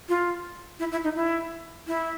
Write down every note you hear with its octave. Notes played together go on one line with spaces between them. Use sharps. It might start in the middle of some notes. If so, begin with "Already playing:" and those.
F4
E4
E4
D#4
E4
E4